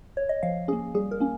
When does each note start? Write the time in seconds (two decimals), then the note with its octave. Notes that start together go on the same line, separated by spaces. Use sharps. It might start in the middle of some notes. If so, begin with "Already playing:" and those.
0.17 C#5
0.29 D#5
0.43 F3 F5
0.68 A#3 C#4 G#4
0.94 G3 G#4
1.11 A#4
1.20 A#3 C#4